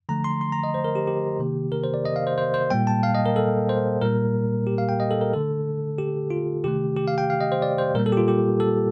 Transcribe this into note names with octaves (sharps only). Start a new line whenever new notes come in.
D3 F3 A3 A#5
C6
C6
A#5
D#5
C5
A#4
G4
G4
C3 D#3 A#3
A#4
C5
D5
D#5
F5
C5
C5
C5
A#2 G3 A#3 G5
A5
F5
D#5
A#4
A4
C5
A#2 G3 A#3 A#4
G4
F5
G5
D#5
A4
A#4
D3 A3 A4
G4
F4
C3 D#3 A3 G4
G4
F5
G5
F5
D#5
C5
D5
C5
A#2 G3 A#3 A#4
A4
G4
F4
G4
A4